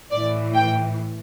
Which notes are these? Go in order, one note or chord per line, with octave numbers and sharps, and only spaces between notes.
A2 E3 D5
G5